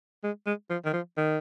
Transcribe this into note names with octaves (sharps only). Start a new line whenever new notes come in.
G#3
G#3
F3
D#3
F3
D#3